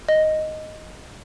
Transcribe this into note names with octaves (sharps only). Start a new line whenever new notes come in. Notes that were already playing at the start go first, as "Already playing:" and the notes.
D#5